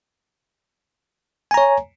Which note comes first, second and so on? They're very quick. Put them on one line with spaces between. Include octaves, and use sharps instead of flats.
G#5 A#5 C#5